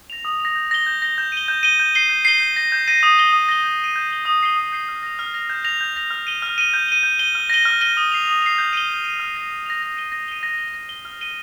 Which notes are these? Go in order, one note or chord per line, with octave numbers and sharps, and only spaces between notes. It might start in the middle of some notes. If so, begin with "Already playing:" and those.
A#6 F7
D#6
F7
A#6
G6
A#6 G7
G6
A#6 G7
G6
D#7 G7
G6
D#7 G7
G6
C7 D#7 G7
G6
C7 D#7 G7
G6
A#6 D#7
G6
A#6 D#7
D#6
A#6 G7
D#6
A#6 G7
G6
D#7 G7
G6
D#7 G7
D#6
G6 C7 D#7 G7
D#6
G6 C7 D#7 G7
F6
A#6 F7
F6
A#6 F7
G6
A#6 F7
G6
A#6 F7
F6
D#7 G7
F6
D#7 G7
G6
D#7 G7
G6
D#7 G7
F6
A#6 D#7 G7
F6
A#6 D#7 G7
D#6
C7 F7
D#6
C7 F7
G6
D#7 G7
G6
D#7 G7
F6
A#6 F7
F6
A#6 F7
A#6
D#7 G7
A#6
D#7 G7
A#6
G7
A#6
G7
F6
D#7 G7